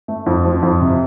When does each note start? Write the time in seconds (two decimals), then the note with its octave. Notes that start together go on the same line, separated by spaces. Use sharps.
0.08 A3
0.26 F2
0.45 F3
0.62 F2
0.81 C3